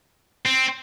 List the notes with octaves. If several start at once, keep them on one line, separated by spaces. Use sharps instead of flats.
C4